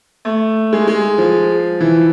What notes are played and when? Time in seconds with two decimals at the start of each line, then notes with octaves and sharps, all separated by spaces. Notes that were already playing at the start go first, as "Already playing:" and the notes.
0.25 A3
0.73 G#3
0.88 G#3
1.18 F3
1.80 E3